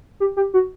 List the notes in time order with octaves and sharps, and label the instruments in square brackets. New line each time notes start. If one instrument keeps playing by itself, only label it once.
[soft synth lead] G4
G4
F#4